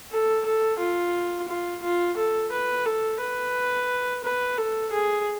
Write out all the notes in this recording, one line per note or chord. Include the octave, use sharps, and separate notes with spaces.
A4
A4
F4
F4
F4
A4
B4
A4
B4
B4
A4
G#4